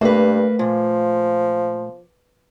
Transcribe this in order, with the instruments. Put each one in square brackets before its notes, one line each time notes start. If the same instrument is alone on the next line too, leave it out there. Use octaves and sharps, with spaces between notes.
[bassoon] G2 [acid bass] A3 [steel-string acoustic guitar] A#3 B4
[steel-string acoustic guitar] A#2 [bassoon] F3